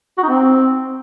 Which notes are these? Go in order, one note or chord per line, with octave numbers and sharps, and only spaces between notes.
F#4
D#4
C4